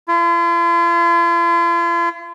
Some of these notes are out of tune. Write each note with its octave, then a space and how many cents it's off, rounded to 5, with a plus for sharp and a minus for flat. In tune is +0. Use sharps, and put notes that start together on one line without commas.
F4 -45